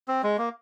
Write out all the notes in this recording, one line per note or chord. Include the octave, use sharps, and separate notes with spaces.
C4
G#3
A#3